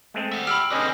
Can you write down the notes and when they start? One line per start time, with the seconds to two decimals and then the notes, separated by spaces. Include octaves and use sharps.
0.14 G#3 A3 C4
0.32 E5 F#5
0.47 G4 B5 E6 F6
0.71 D3 C4 C#4 G#4 B4 D5 D#5